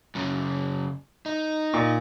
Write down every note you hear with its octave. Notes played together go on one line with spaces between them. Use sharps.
F#2 C#3
D#4
A#2